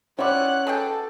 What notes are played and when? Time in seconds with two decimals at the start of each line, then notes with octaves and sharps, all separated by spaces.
0.19 C4 C#4 E4 D5 F#5 D6 F#6
0.67 B2 G#4 A4 G5